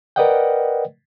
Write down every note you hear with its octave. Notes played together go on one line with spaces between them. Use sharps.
A#4 B4 D5 D#5 F#5 G5